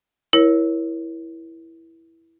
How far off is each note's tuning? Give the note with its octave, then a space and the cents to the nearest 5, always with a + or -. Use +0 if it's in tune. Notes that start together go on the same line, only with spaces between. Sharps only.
E4 +0 A#4 +35 C#5 +0